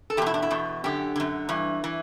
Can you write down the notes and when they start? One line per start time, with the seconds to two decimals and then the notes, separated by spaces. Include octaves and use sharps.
0.10 A4
0.17 E2 G4
0.22 B2 E4
0.34 D4
0.42 E4
0.51 E2 B2
0.84 F#2 D3 G4
1.16 F#2 D3
1.49 G2 E3
1.84 E3